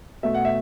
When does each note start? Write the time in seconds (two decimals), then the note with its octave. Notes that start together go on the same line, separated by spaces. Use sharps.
0.23 B2 A3 E5
0.35 F#5
0.45 E5